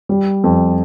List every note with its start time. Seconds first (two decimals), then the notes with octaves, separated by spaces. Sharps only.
0.09 G3
0.44 F2